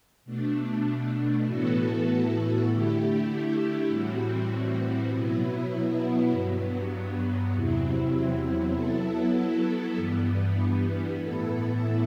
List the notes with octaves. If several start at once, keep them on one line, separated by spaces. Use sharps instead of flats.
B2 A3 D4
A2 E3 B3 F#4 A4
D3 A3 E4 G4
A2 E3 G3 C4 F#4
B2 F#3 B3 E4
G2 F#3 B3
E2 C3 F#3 C4 E4
F#3 B3 E4 A4
G2 E3 G3 B3
A2 E3 B3 E4 A4